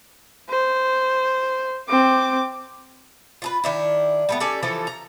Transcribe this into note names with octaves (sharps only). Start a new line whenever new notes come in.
C5
C4 D6
F4 G#4 B4
D#3 D4 E4
G3 A3 B3
C#4 G4 A4 D5
E3 F3 C#4 A4
A#5